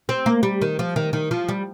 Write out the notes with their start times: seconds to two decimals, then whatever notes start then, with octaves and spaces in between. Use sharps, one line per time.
0.09 C4
0.26 A#3
0.43 G3
0.62 D#3
0.79 F3
0.96 D#3
1.13 D#3
1.31 F3
1.49 G3